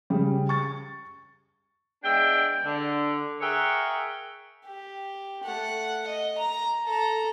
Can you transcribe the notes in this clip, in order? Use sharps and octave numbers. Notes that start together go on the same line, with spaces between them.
C#3 G3
C#6 A6
G#3 B3 D4 E5 G5
D3
G#4 A#4 C#5 E5 F#5 G5
G4
A3 F#5
D#5
A#5
A4 A#5